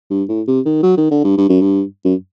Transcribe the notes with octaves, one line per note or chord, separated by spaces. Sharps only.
G2
A2
C3
D#3
F#3
D#3
D3
G2
G2
F#2
G2
F#2